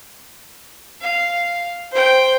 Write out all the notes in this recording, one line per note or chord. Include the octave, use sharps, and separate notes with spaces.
F5
C5 G5